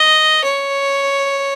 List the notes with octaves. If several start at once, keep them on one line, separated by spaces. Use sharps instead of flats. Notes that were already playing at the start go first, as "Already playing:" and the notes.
Already playing: D#5
C#5